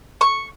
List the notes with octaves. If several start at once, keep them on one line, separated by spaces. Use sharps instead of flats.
C#6